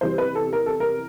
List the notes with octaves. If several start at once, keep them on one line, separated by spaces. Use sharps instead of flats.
E2 C3 E3 G3 C5
B4
A4
A#4
A4
A#4